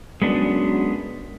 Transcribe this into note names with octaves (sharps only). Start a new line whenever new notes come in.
F#2 G#3 B3 D4